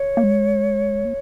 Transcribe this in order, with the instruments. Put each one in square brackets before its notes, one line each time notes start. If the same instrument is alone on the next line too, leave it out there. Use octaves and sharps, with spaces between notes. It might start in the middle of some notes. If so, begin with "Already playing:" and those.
Already playing: [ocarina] C#5
[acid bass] A#3
G#3
A#3